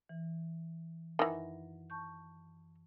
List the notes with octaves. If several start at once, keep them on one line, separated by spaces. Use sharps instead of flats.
E3
F#2 D#3 E3 F#5 A#6
A5 C#6 G6